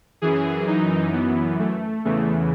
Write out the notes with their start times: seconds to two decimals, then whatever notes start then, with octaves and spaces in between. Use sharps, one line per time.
0.22 F#2 E3 G#4
0.67 D#4
1.13 B3
1.59 A3
2.05 E2 C#3 E3 A3